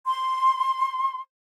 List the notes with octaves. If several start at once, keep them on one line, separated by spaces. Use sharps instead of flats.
C6